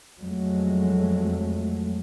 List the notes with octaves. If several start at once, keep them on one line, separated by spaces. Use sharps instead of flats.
F2 F#3 G#3 A3